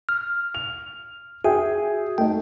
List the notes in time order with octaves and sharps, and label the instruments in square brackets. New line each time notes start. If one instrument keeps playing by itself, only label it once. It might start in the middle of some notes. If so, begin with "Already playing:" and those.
[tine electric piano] F6
[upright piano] F7
[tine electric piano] F#4 [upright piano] G#4 E5 G5
[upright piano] A3 D#4 [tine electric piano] G5